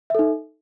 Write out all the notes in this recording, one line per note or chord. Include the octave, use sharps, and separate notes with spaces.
D#4 A4 E5